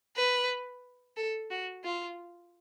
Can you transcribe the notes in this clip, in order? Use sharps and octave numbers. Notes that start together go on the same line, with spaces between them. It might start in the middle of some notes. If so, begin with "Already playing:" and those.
B4
A4
F#4
F4